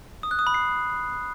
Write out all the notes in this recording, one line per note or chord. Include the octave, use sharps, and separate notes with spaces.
D#6
F#6
D#6
B5
C7